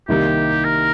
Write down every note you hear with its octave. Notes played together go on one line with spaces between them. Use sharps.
C2 C3 D#3 G3 A#3 G4
A#4